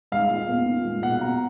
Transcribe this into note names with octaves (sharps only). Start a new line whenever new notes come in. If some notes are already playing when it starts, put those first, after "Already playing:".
G#3 F5
A#2
B3
A#2
G#3
B2 F#5
B3 A#5